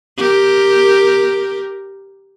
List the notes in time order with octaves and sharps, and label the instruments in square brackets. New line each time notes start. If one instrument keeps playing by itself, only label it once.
[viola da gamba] G4 A#4